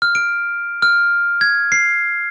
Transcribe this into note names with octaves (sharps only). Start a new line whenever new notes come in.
F6
D7
F6
G#6
C7